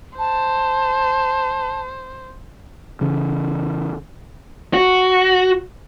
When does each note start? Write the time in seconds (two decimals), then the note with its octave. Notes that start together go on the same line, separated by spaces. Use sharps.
0.18 C5 A5
3.01 C#3 E3 C#4
4.74 F#4